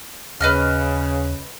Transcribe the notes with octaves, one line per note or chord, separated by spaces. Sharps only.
D#2 C#3 B4 D#5 F6